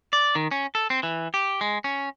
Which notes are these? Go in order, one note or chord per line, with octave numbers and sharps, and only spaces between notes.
D5
D#3
C#4
A4
C4
E3
G4
G#3
C#4